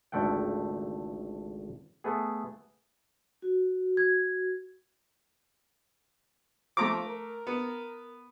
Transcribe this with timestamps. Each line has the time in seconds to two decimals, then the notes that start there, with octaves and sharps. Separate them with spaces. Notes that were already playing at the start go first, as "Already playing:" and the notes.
0.12 G#1 C#2 D3 A3 F#5 G5
2.04 A3 B3 G#4
3.42 F#4
3.97 G#6
6.77 F3 A3 A#5 D6
7.07 A#4
7.47 B3